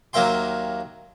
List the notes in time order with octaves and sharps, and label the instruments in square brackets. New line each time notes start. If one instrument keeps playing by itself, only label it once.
[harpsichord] D#2 F#3 A#3 E5 G5 C6